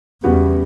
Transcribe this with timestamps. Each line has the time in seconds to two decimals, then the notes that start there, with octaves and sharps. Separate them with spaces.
0.23 E2 C#3 G3 B3 F#4 B4